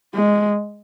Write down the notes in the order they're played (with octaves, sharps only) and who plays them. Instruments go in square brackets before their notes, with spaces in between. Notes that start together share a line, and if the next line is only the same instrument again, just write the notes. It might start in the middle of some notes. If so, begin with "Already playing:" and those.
[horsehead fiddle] G#3